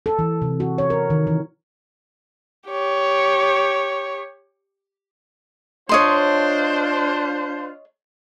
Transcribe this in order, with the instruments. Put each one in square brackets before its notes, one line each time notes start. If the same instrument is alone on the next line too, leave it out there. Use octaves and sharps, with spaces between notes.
[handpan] A4
E3
C3
F#4
C#5
A#4
D#3
E3
[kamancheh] G4 C#5
[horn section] D4 F4 C5 [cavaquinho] C#5 D#5 C6